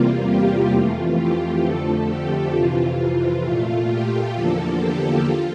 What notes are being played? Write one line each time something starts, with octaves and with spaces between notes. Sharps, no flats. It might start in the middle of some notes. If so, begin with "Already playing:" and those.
Already playing: E2 C3 G3 A#3 F4
G4
F2 E3 A3 F4
G4
F2 D3 F3 A3 A4
G4
F2 C3 E3 F4
F4
A#2 A3 F4
G4
E2 D3 F3 A#3 A4
G4
F4